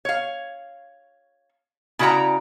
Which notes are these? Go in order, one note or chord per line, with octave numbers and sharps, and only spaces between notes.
C#5 F5
C#3 E4 F#4 D5 G5 A#5